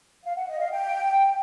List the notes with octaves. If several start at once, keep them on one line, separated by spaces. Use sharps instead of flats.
F5
F#5
D#5
F5
G5